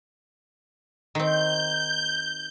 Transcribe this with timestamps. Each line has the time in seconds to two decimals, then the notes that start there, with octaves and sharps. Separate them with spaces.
1.15 D#3 C4 G6